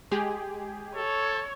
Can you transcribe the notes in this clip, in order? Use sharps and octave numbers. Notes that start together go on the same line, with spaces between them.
G#3 G4 G#4
A4 C#5